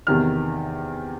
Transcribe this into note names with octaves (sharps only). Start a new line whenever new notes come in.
E2 C3 D#3 F6